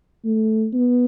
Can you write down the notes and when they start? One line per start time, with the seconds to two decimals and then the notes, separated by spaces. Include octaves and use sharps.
0.25 A3
0.73 B3